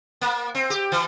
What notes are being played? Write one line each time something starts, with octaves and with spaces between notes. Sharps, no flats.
A#3
C4
G4
E3